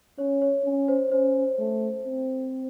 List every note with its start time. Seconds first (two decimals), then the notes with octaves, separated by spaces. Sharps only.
0.18 C#4 C#5
0.41 C#5
0.65 C#4
0.88 C5
1.12 C#4 C5
1.59 A3
2.05 C4